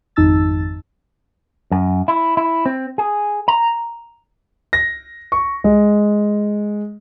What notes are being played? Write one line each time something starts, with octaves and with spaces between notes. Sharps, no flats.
G#1 F2 D#4 A5 E6 A6
F#2
E4
E4
C4
G#4
A#5
A#6
C#6
G#3